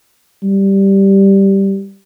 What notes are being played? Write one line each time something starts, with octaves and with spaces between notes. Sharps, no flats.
G3